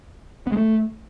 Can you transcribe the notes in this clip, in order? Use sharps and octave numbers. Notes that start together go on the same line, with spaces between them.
B3
G#3
A3